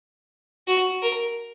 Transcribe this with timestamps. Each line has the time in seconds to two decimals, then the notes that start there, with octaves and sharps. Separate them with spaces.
0.67 F#4
1.03 A#4